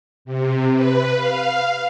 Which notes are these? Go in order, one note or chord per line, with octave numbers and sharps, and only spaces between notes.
C3
B4
F5